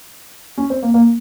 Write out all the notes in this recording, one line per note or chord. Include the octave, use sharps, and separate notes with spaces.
C#4
C4
A#3
A#3